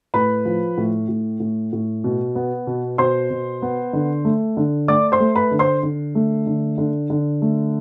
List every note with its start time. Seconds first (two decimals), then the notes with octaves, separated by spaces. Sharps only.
0.14 A2 B4 B5
0.45 F3
0.77 A2
1.09 A2
1.40 A2
1.73 A2
2.04 B2
2.35 B3
2.67 B2
2.98 B2 C5 C6
3.30 B2
3.62 B3
3.93 D3
4.25 A3
4.57 D3
4.88 A3 D5 D6
5.12 C5 C6
5.20 A3
5.36 B4 B5
5.51 D3
5.59 C5 C6
5.83 D3
6.15 A3
6.47 D3
6.78 D3
7.10 D3
7.42 A3